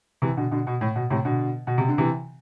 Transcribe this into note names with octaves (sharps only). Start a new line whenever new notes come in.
C3 E3
B2 D3
B2 D3
B2
A2
B2
A2 C3
B2 D3
B2
C3
D3
C3 E3